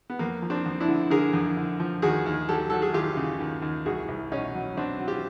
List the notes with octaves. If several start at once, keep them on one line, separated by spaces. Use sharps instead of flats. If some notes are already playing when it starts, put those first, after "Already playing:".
B3
F2 A#3
F3
C4 D4
F2
D4 E4
D3
D3 G#4 A#4
F2
D3
F3
D#2 F#4 G#4
D#2
F#3 G4 A4
F#3 A4
G#4
D#2 F4 G4
C#3
D#2
D#2
C2 F#4 G#4
C2
B2 C#4 D#4
F#3
F#3 C4 D4
F#3
F4 G4